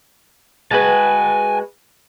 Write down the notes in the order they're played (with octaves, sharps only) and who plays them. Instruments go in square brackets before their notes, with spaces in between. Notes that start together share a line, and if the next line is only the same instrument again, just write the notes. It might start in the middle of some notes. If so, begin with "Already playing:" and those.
[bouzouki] G#3 F#4 B4 [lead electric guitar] G#5 A5